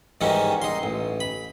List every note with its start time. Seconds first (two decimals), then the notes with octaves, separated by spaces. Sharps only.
0.21 G#2 D#3 E3 G3 C#4 D#4
0.62 D#4 C6
0.83 A1
1.20 B5